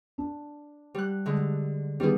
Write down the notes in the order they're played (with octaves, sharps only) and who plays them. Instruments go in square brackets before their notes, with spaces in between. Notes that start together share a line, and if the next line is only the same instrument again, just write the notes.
[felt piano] D4
[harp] G3 F#6
D3 G#3
[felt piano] D#3 B3 [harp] G3 D4 G#4